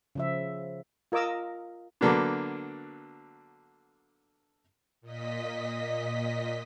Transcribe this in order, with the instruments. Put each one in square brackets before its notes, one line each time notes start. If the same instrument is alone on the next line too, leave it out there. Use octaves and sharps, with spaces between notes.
[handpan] C#3 F3 E5
[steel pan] F4 A#4 D#5 D6 E6
[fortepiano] D3 F#3 A#3 B3 D4
[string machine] A#2 D#5 B6